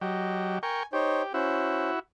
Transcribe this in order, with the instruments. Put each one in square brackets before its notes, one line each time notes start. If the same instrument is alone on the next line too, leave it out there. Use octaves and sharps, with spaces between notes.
[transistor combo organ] F#3 G4 [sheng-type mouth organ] D#5
[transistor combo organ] A#4 G5 C#6 [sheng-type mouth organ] G#5
[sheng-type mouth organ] D#4 C5 C#5 [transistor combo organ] G4
[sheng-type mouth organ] C#4 C5 [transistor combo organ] E4 F#4